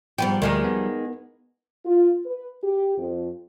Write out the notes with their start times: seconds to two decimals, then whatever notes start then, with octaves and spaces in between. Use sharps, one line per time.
0.18 G#2 F3 G3 B3 G4
0.42 D2 D#3 G#3 A#3
0.64 B3
1.85 F4
2.25 B4
2.63 G4
2.99 F2